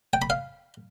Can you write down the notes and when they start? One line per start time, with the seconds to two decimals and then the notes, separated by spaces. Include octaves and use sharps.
0.13 G5
0.22 B5
0.30 F5